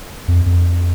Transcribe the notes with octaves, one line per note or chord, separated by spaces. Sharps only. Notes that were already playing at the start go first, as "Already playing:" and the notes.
F2
F2